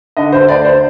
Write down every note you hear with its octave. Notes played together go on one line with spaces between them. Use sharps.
D3 D#5
C5
D2 D5
C5